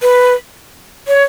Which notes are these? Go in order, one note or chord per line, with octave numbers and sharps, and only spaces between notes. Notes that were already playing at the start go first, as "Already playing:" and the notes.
B4
C#5